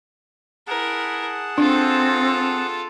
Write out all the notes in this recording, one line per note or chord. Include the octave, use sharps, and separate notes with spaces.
E4 G#4 A#4 F#5 A5
C4 D4 F4 A4